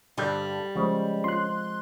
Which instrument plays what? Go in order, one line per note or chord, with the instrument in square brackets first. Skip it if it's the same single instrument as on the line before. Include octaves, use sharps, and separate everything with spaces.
[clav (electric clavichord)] G2 D3 G5 [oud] G3
[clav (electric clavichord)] C#3 [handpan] F3 G#3 C5
[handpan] C4 F4 [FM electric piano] C6 F#6